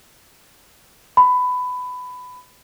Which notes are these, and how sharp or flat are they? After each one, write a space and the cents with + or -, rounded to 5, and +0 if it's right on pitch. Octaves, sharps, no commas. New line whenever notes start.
B5 +15